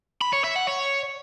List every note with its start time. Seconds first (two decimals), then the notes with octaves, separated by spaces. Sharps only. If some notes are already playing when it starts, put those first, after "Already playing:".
0.21 B5
0.33 C#5
0.44 E5
0.56 F#5
0.67 C#5